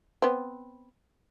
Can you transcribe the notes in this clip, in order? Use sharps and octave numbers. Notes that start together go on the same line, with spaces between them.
B3 C4